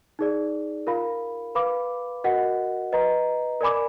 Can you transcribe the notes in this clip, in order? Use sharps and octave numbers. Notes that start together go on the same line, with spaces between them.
D#4 G#4 D5
F4 A#4 F5 B5
B4 F5 B5 D6
F#4 A#4 D#5 F#5
B4 D#5 A#5
A#4 D5 G#5 B5 D6